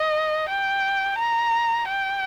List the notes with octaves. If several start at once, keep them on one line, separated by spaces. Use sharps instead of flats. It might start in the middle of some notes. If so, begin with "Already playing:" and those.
Already playing: D#5
G5
A#5
G5